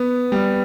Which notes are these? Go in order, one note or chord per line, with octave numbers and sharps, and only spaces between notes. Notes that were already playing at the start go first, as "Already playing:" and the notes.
Already playing: B3
G3